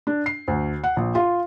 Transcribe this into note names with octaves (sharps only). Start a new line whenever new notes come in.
D4
C7
D2
F#5
A#1
F4